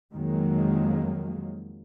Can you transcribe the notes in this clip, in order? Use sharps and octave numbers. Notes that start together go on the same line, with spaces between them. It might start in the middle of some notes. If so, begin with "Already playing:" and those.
F2 D#3 F#3 G#3 A#3